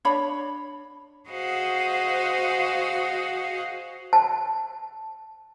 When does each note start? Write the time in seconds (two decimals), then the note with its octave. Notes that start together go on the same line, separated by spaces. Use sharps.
0.05 D4 C#5 B5
1.28 F#4 G#4 C5 D#5 F5 F#5
4.13 A5